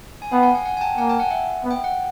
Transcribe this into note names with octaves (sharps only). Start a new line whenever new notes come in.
G#5
B3 F5 G5
F#5 G#5
F#5 G#5
F#5 G#5
G#5
G5 A5
A#3 F#5 G#5
G5 A5
F#5 G#5
E5 F#5
B3
G5
F#5